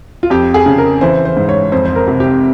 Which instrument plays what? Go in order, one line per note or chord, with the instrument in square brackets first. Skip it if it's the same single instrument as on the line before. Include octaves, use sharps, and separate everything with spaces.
[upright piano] F4
F2 G4
G#4
C#3
A#4
E3 C5
C5
G#2
C#5
F2 C5
C5
A#4
C3
G4